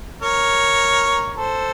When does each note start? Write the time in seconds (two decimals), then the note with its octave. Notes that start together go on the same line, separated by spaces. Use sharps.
0.22 A#4 C#5
1.37 A4 C5